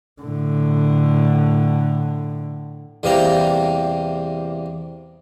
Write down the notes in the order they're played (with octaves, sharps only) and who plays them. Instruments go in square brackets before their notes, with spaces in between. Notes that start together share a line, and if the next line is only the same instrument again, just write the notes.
[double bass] A2 D3
[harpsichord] E2 C3 G3 A#3 G4 A#5